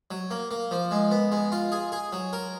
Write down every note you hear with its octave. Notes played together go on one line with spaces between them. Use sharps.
F#3
A#3
A#3
F3
G#3
B3
G#3
F4
G#4
G#4
F#3
A#4